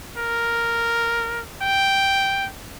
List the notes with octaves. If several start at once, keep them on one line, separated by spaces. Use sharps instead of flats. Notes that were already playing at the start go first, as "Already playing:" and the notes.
A#4
G5